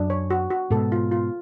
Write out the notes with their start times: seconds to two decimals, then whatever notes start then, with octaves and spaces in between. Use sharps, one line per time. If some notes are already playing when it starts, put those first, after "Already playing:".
Already playing: F#2 D4
0.10 C#5
0.31 F#4
0.50 F#4
0.70 G#2 B2 A4
0.92 F4
1.12 F4